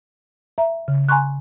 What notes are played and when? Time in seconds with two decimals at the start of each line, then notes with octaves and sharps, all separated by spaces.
0.58 E5 A#5
0.88 C#3
1.09 G#5 A#5 C6 C#6 F#6